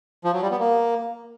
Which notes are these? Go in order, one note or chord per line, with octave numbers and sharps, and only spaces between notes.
F3
F#3
G3
B3
A#3